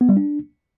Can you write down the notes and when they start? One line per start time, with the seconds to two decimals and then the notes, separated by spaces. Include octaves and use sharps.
0.01 B3
0.09 G3
0.17 D4